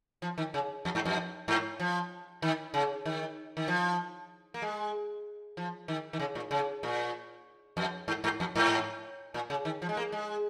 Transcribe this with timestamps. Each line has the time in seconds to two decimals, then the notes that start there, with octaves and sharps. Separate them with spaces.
0.22 F3
0.38 D#3
0.54 C#3
0.85 F2
0.95 G#2
1.05 F2
1.48 G#2
1.80 F3
2.42 D#3
2.74 C#3
3.05 D#3
3.57 D#3
3.68 F3
4.54 A#3
4.62 G#3
5.57 F3
5.88 D#3
6.13 D#3
6.19 C#3
6.35 A#2
6.51 C#3
6.83 A#2
7.77 F2
8.08 G#2
8.24 G#2
8.40 F2
8.55 G#2
9.34 A#2
9.50 C#3
9.65 D#3
9.82 F3
9.89 G#3
9.97 A#3
10.12 G#3